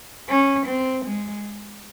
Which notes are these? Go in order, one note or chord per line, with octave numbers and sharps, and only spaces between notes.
C#4
C4
G#3